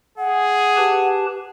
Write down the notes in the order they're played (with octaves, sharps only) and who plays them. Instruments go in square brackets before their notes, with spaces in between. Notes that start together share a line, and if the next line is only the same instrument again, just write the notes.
[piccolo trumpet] G#4 [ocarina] F#5
[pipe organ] G4 B4 A5